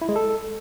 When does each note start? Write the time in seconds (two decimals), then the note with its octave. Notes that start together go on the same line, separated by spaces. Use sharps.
0.01 E4
0.09 G#3
0.16 A4